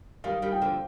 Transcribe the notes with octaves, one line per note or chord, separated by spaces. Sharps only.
D#3 G3 F5
D#3 G3
G5
D3 F3